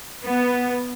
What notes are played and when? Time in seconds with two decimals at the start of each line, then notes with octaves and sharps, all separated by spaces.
0.24 B3